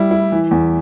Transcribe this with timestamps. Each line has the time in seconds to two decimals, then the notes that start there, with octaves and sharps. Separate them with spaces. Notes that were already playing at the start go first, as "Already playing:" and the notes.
Already playing: G3 E4
0.11 E4
0.32 E3
0.51 E2